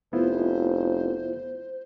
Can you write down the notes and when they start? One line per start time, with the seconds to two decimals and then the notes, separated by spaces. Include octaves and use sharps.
0.13 F1 B3 E4 F4 C5